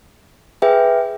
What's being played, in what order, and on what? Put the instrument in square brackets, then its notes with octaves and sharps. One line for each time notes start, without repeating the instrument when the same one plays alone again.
[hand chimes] G#4 B4 E5 G5